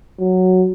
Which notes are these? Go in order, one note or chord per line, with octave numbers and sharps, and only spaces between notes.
F#3